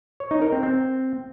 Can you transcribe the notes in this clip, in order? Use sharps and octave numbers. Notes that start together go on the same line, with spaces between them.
C#5
D#4
A#4
C4
C4